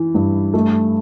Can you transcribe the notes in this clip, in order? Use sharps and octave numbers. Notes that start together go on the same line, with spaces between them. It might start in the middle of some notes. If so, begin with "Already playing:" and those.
Already playing: E3 E4
G2
A3